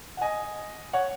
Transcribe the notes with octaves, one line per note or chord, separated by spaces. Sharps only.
F#5
D#5 G#5
C#5 F#5